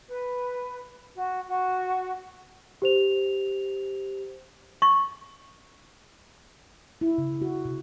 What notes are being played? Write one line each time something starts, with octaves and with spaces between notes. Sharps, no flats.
B4
F#4
F#4
G4 C5 F7
C#6
E4
C#3
F#4
C3